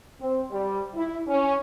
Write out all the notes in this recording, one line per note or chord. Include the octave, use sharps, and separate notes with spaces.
C4
G3
E4
C#4